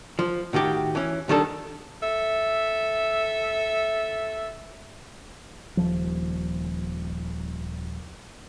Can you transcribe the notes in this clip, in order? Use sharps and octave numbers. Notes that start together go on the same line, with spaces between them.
F3
A2 D#3 F#4 G4
E3 C#4
D#3 G3 D4 A4
A4 E5
D#1 F3